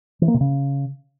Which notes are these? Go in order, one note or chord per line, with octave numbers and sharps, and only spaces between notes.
E3
A#3
C3
C#3